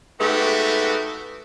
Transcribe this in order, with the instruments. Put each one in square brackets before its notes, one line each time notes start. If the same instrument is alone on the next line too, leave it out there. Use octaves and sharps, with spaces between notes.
[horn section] G#2 A3 B3 F#4 G4